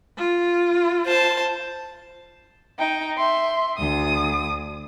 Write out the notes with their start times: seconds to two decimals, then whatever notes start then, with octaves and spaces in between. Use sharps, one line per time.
0.17 F4
1.06 C5 A5
2.79 D#4 G5
3.18 E5 C6
3.78 D2 D#6